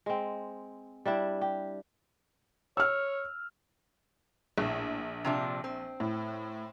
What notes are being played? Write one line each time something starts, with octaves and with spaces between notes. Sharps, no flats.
G#3 C4
G3 D4 E4
G4
C#5 E6 F6
A#1 A2
C3 F3 D4
C4
A2